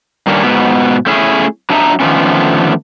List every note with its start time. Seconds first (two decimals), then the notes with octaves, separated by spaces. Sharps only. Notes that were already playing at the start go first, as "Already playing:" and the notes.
0.27 G2 D#3 G3 A#3 C#4 D4
0.43 G#2 B2 B3
1.06 A3 C#4 E4 G#4
1.70 F#3 D4 D#4 E5 G5 A#5
2.00 D3 D#3 F3 A3 B3 C#4